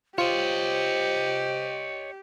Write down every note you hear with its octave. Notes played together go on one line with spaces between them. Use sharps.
F4 G4 C5 C#5 D#5